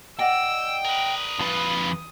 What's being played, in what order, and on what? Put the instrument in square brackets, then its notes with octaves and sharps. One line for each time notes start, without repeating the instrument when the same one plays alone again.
[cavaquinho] D5 D#5 F#5 [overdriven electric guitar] G5 [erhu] E6
[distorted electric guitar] A#4 B4 [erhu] D#6
[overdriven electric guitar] F2 B4 [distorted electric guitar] E3 F4